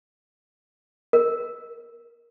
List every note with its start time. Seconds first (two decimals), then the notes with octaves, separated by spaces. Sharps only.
1.13 A#4